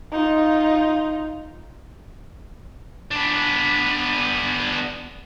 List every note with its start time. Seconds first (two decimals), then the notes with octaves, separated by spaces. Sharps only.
0.12 D#4 F4
3.11 B3 D4